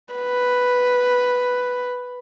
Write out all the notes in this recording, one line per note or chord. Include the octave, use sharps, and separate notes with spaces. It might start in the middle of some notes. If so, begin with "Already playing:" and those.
B4